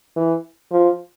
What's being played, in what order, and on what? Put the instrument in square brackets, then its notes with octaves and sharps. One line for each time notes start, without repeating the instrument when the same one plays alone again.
[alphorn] E3
F3